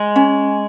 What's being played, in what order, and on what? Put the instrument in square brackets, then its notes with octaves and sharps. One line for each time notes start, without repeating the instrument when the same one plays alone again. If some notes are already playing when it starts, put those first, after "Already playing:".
Already playing: [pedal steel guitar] G#3
[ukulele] C#4